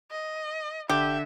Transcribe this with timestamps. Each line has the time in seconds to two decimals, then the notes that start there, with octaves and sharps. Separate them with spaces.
0.11 D#5
0.89 F1 D3 G4 E5